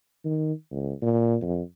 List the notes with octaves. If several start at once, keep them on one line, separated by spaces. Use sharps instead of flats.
D#3
C#2
A#2
F2